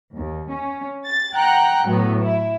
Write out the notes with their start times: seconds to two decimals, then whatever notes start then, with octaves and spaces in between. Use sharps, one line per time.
0.16 D#2
0.51 C#4
1.04 A6
1.35 F#5 G5 A#5 F#6
1.86 A2 F#3 B3
2.22 E4 E5